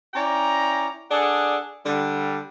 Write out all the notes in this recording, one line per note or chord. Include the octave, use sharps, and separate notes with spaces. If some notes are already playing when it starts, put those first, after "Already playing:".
C#4 E4 D5 G5 A#5
D4 G#4 A4 D5 F#5
D3 G3